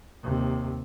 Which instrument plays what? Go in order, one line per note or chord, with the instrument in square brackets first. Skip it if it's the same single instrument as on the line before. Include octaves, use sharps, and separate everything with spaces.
[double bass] D#2 C3